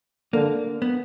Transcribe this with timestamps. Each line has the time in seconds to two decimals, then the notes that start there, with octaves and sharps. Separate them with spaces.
0.33 D3 A#3
0.82 B3